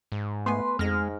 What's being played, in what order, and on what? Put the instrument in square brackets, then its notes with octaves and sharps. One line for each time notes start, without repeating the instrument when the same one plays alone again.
[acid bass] G#2
[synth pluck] A3 B3 G#5 [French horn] B4 [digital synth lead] C6
[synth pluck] F2 A#6 [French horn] G#2 [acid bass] G#3 [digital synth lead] F6